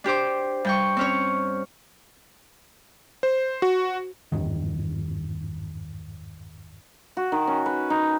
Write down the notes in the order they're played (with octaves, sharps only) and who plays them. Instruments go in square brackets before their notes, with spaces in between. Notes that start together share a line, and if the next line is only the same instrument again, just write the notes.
[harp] D4 G4 C5 D6
G2 G5 C#6
C4 C#4 C#5
[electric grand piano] C5
F#4
[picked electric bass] G#1 E2 G2 D#3
[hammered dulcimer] F#4
D#3
C#4
B4
D#4